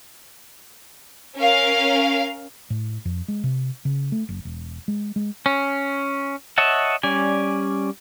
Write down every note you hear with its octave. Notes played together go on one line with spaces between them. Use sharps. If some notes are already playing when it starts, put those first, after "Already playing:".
C#4 A#4 F5
A2
F2
G#3
C3
C#3
A3
F#1
E1
G#3
G#3
C#4
C#5 D#5 E5 F#5 A5
G3 C#4 D5 G#5